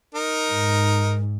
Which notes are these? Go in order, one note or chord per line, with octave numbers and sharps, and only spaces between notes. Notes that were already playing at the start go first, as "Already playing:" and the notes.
D#4 A#4
G#2